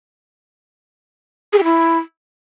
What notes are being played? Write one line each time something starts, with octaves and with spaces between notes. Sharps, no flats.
G#4
G4
E4